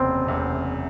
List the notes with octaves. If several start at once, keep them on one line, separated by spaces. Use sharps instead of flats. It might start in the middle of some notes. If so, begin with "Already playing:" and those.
Already playing: F#1 E2 C3 C4
F#1 E2 C3